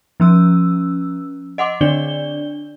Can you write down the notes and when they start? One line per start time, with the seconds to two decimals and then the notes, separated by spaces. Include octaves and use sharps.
0.20 F3 C#4 E6
1.58 D#5 F#5 C6 D6
1.81 D3 D4 D5 G7